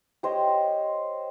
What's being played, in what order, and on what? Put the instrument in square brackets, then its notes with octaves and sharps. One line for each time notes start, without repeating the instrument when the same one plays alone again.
[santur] G4 C5 C#5 D#5